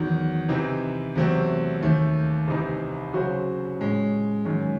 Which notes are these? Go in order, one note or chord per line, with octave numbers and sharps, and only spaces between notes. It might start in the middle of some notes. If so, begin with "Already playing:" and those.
Already playing: E2 D#3 F#3
C3 E3 C4 D#4
E2 C3 F#3 A3 C4
D#2 D#3 A3
C2 C3 E3 C4 D#4
C#3 F#3 C#4 F#4 C5
A2 G#3 C#4
F#2 D#3 G#3 C#4